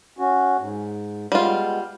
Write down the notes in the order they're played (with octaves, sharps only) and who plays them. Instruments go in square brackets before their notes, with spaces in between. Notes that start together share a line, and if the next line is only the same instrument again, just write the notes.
[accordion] C#4 F#4
G#2
[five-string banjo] G3 F4 [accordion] G#3 B3